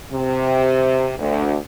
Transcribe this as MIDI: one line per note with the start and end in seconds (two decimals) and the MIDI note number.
0.11 1.12 48
1.18 1.55 38